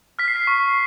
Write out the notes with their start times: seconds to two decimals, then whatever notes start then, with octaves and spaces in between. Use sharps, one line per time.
0.19 F6 B6
0.28 C7
0.36 B6
0.47 C#6